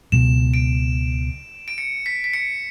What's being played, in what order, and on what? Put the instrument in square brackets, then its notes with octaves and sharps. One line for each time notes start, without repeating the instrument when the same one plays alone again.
[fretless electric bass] C#2 B2 F#3 [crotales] E7
[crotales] D7
D7
C#7
B6
B6
C#7